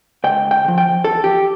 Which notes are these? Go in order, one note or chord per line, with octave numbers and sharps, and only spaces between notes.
C#2 G5
G5
C#3
F3
G5
E2 A4
G4